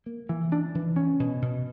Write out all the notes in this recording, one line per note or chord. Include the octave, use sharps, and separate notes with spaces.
A#3
E3
D4
E3
C#4
B2
B2